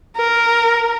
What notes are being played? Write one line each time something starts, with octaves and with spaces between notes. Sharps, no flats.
A#4